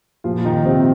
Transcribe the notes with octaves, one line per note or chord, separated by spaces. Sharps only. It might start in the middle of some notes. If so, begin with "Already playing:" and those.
A#2 F3 F4
D#3 D#4
C3 C4